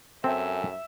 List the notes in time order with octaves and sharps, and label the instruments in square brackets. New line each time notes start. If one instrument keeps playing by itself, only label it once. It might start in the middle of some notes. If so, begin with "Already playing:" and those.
[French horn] F#2 [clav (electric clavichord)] C4 [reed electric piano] A4 G5 G#5 [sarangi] E5